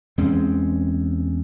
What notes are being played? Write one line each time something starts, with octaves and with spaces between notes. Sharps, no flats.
E2 G#3 C4 C#4